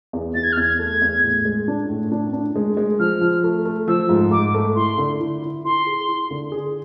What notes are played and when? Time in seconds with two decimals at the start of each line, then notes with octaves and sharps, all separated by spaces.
0.13 E2
0.34 E2 A6
0.43 G#6
0.52 F6
0.57 E2
0.62 G#6
0.79 A3
1.02 E2
1.23 A2
1.45 G#3
1.68 D4
1.89 A2
2.12 D4
2.33 D4
2.56 G#3
2.77 G#3
3.00 F3 F6
3.21 F3
3.44 A3
3.65 A3
3.88 F3 E6
4.09 G#2
4.31 G#2 D6
4.55 A3
4.75 E4 C6
4.98 D3
5.20 E4
5.43 E4
5.65 E4 C6
5.87 G#4
6.08 E4
6.31 D3
6.52 G#4